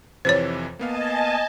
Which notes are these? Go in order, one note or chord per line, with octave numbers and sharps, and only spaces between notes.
F2 C3 E3 C5 C#5
A#3 B3 D#5 F5 G#5 A5